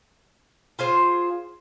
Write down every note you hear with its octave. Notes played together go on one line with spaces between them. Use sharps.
F4 G#4 C5